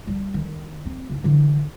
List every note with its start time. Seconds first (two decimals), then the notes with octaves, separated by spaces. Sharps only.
0.07 G3
0.34 D#3
0.86 C4
1.10 G#2 C#3
1.24 D3 E3